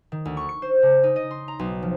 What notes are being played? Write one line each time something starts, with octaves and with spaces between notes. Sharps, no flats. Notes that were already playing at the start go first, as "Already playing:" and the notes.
D#3
D2
C#6
C#7
C5
C#3
D#4
D#5
C6
A#5
B1
F3